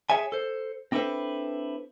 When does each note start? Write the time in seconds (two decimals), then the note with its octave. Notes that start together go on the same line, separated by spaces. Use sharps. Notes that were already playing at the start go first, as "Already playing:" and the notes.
0.10 G#4 C#5 E5 G#5
0.32 A4 C5
0.92 C4 D4 E4 A4 B4 C5